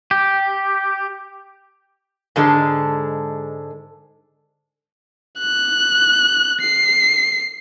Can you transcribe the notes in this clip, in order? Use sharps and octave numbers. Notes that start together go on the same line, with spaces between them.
G4
G#2 D3 G#3 A4
F#6
C7